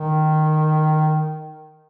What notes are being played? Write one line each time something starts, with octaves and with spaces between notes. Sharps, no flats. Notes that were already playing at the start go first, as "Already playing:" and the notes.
Already playing: D#3